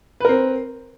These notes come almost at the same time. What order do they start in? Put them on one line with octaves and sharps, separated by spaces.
B4 A#4 C4